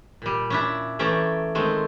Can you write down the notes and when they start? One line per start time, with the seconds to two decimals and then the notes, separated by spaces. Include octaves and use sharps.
0.22 A#2 G3
0.50 C#4 D4 E4
0.99 E3 A3 C#4 D5 G5 A#5
1.55 D#3 G#3 A3 C4